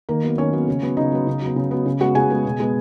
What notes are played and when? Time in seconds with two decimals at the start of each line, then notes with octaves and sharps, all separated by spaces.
0.09 D#3 A#3 A#4
0.23 F#3 B3
0.38 D#3 C#4 C#5
0.53 F#3 B3
0.68 C#3
0.82 F#3 B3
0.97 C#3 D#4 D#5
1.12 F#3 B3
1.27 C#3
1.42 F#3 B3
1.56 C#3
1.71 F#3 B3
1.86 C#3
2.01 G#3 B3 F#4 F#5
2.15 C#3 G#4 G#5
2.30 G#3 B3
2.45 B2
2.60 G#3 B3